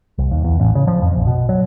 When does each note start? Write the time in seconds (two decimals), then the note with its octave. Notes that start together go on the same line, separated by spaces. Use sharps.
0.18 C2
0.31 D#2
0.44 E2
0.60 A1
0.75 C#3
0.87 F3
1.02 F2
1.15 A#1
1.27 B2
1.49 F#3